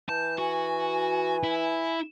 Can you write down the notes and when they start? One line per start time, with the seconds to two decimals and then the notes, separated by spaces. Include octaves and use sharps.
0.09 E3 A5 G6
0.38 F#4 G#5
1.43 E4